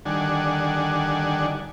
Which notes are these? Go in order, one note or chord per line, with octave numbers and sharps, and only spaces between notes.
D3 D#3 G3 D4 F#5 G#5